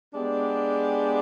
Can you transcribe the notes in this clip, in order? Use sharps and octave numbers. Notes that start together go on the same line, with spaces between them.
G#3 B3 D4 G4